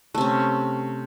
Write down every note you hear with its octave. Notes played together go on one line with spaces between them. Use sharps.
C3 A3 C#4